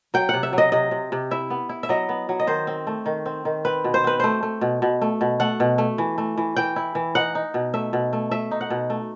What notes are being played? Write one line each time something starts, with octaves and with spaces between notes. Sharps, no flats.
F#3 G5
C3 F#5
E5
F#3
D#5
C3 D#5
C3
C3
E4 E5
B3
E4
E5
F#3 D#5
B3
F#3
D#5
D#3 C5
C4
A3
D#3
C4
D#3
C4 B4
B2
C5
C4 B4
A3 C5
A3
B2
B2
A3
B2
A3 F#5
B2
A3
E3
A3
E3
E3 G5
E4
E3
D#4 F#5
D#4
B2
A3 E5
B2
A3
A3 E5
D#4
F#5
B2
A3